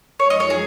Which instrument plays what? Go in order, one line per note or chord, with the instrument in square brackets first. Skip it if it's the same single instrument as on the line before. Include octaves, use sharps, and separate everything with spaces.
[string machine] F#2 F3 G#3 D#4 A#4 [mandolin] C#5
[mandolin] D#5
C#5
G#4